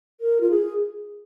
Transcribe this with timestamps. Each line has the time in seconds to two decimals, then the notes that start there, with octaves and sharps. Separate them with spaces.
0.21 A#4
0.41 F4
0.51 G#4